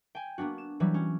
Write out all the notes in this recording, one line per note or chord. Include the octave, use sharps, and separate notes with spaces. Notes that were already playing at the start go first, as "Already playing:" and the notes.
G5 G#5
A#3 B3 D4 F#4
E7
E3 F#3 G3
C#4